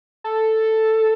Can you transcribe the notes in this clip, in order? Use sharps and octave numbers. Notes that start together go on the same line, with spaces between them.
A4